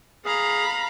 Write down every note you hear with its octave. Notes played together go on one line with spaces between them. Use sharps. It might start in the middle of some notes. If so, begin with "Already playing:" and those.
G#4 F5 A#5 B5